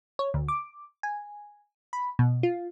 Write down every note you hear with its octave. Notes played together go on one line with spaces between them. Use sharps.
C#5
D2
D6
G#5
B5
B2
F4